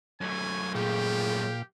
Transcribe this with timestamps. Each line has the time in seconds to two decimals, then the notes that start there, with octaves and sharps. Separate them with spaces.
0.21 F#2 A3 G#5
0.74 A#2 G4 G#4 F5 G5